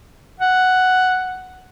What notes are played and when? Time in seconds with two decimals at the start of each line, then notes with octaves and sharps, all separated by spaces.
0.40 F#5